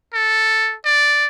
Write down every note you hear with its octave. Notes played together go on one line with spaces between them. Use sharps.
A4
D5